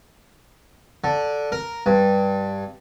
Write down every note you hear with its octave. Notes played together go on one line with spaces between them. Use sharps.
D3
A#4
G2